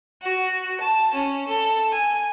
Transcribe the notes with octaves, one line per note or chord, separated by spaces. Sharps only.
F#4
A5
C#4
A4
G#5